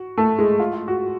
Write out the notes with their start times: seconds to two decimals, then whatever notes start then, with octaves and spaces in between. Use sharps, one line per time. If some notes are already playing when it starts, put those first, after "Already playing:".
Already playing: F#4
0.18 A3 A4
0.39 G#3 G#4
0.60 F4
0.73 F4
0.88 F#4